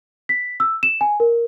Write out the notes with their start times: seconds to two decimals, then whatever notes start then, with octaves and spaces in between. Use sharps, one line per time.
0.29 B6
0.60 E6
0.83 E7
1.01 G#5
1.20 A#4